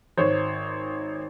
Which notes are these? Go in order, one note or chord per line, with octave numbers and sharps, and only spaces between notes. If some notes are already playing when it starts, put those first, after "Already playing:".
G#1 C5 C#5